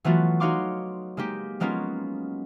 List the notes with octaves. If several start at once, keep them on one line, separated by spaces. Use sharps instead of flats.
E3 F#3 A3 B3 F4 F#4
D#4 F#4 C#5 F5 C6 D6
G#3 A#3 D#4 G4
F#3 G#3 A#3 B3 C#4 F4